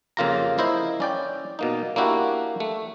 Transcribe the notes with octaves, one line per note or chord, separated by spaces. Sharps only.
F2 C#3 A#3 F4 G4 A#5
A#3 E4 C5 D#5
C#4 D5 G5
B2 A#3 D#4
A#3 D4 E4 F#4 G4
A3